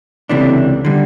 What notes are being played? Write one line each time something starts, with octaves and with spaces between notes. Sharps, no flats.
C#2 C3 E3 A3 D4
D3 G3